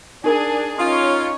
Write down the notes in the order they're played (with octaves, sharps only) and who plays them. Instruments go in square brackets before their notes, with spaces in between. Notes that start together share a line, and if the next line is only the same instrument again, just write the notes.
[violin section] D4 G#4 [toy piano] D#4 A#4 A#5
[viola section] C#4 C#5 [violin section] D#4 [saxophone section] F4 [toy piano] D#6